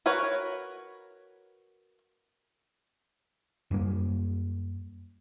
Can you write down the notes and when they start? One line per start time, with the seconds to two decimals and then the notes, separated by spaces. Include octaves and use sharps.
0.06 F#4 A#4 B4 C#5
3.71 F#2 G3 A#3